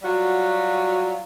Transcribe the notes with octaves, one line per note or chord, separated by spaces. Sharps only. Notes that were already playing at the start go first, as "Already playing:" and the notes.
F#3 G3 F4 F#4